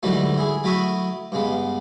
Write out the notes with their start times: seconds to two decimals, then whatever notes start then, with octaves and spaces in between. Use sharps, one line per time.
0.03 G#2 D3 E3 F#3 G3 A3
0.37 E4 G#4
0.64 F#3 A3 E4 B5 C#6 D#6
1.32 G2 C#3 G#3 B3